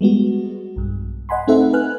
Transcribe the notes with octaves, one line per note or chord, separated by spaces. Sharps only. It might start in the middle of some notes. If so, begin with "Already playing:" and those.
G3 G#3 B3 F#4
B1 G2
D#5 F#5 G#5 B5 C6
A3 C4 D#4 A4 E5 F#5
B4 G#5 F6 F#6